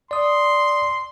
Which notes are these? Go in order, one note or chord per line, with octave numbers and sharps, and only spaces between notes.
D5 C6 D#6